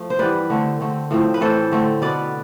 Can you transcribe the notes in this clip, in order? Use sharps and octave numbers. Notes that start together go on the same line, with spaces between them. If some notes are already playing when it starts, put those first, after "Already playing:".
Already playing: F3 A3
C5
G2 E3 G3 B3 B4 D5
D3 A3 C4
D3 A3 C4
A2 F3 A3 C4
B4
A2 E3 A3 C4 A4 C5
D3 A3 C4
B2 B3 B4 D5